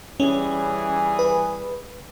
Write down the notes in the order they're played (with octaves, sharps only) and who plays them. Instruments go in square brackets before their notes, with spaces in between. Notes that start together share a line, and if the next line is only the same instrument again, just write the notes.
[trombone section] E3 G3 G#4 [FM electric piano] C#4
[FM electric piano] B4